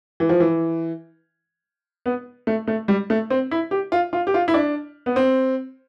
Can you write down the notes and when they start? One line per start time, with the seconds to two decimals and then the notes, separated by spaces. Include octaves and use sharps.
0.20 E3
0.29 F3
0.40 E3
2.06 B3
2.47 A3
2.68 A3
2.88 G3
3.10 A3
3.30 C4
3.51 E4
3.71 G4
3.92 F4
4.13 F4
4.27 G4
4.34 F4
4.48 E4
4.54 D4
5.06 B3
5.16 C4